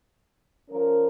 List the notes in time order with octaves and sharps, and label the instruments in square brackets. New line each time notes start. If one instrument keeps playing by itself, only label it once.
[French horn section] F3 C#4 A#4